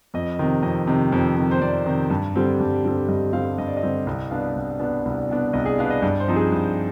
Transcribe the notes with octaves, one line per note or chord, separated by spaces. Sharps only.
F2 D#5
C3 D#3
F2 D#5
C3 D#3
F2
C3 D#3
C5
F2 D5
C3 D#3
G2
D3 G3 C4
G2
D3 G3 C4
G2 D#5
D3 G3 C4 F5
G2 D#5
D5
D#5
D3 G3 C4
C2 D#5
B2 B3 D4 F5
C2
B2 B3 D4
C2
B2 B3 D4
C2 D#5
G#4
B2 B3 D4 F5
D#5
G2 D5
C5
F3 C4 D#4
G#4
G2